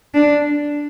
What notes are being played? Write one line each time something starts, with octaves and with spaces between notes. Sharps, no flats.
D4